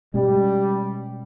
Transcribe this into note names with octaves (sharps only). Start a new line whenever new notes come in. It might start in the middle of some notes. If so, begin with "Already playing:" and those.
B2 G3 G#3 C#4